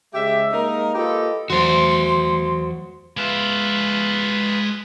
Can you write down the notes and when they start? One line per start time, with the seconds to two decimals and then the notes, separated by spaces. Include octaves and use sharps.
0.14 C#3 G#3 G4 E5
0.53 G#3 A#3 D#4 A#4
0.95 A#3 F4 G4 A4 B4 D#5
1.50 E2 F#3 F#4 C5 C6
3.17 G#3 F4 B4 E5